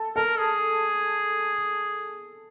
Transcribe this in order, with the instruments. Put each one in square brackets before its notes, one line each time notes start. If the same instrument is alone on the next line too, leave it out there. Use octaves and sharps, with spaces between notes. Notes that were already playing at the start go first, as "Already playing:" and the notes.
Already playing: [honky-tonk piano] A4
[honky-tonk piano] A4 [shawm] A#4
[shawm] G#4